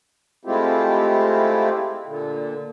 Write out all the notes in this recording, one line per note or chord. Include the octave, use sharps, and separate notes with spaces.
G#3 A3 C4 E4 F4 G4
A#2 D3